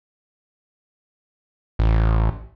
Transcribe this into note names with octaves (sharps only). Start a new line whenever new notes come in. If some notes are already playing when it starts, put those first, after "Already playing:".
A1